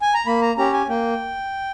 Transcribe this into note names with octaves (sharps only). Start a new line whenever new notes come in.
G#5
A#5
A#3 B5
A#5
C#4 G4 A#5
G#5
A#3 G5